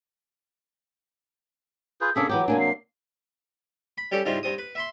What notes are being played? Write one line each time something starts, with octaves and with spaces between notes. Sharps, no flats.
F4 G#4 B4 G6
C3 A#3 C#4 D4 G#4 A4 B6
E3 F#3 F#4 G4 D6
C3 A#3 D4 G#5
C7
B5
G3 C#4 G4 A4 D5
G#2 C#3 G3 C4 E4 F4
G2 C4 D#6
B4
E5 B5 C6